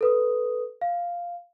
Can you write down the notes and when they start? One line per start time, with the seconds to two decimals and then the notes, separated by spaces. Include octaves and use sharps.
0.01 A4 B4 D#6
0.82 F5